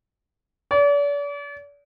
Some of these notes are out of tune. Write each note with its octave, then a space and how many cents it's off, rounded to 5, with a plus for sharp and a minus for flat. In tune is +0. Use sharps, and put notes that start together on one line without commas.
D5 -40